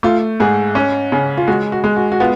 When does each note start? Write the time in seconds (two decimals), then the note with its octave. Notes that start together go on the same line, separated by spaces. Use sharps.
0.03 A3 F4
0.40 G#2 G#4
0.75 C#4
1.12 C#3
1.38 F4
1.47 G#3 F#4
1.72 F#4
1.84 G#3
1.97 F#4
2.12 F#4
2.20 B3 F4